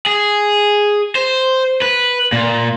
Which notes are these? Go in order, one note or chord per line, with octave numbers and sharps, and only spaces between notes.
G#4
C5
B4
A#2